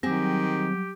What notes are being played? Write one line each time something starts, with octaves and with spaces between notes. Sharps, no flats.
D#3 F#3 G3 C4 G4 G#4